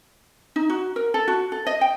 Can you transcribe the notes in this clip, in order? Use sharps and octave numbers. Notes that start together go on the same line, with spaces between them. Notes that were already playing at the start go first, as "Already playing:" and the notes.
D#4
F#4
A#4
A4
F#4
A4
D#5
G5